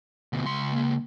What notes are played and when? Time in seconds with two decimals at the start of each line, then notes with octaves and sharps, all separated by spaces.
0.33 D2 B2
0.44 C#2 C6
0.72 A#3